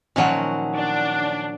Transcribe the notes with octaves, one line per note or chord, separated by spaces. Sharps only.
A#2 D#3 F3 F#3 C#4 F#5
D4